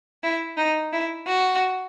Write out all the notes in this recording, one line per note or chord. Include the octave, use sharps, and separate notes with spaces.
E4
D#4
E4
F#4